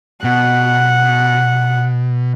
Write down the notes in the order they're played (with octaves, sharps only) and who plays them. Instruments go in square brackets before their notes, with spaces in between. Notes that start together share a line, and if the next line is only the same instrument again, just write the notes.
[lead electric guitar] B2 [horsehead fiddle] F#5